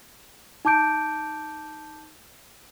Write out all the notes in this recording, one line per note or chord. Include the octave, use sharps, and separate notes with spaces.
D#4 A5 D6 G6 D7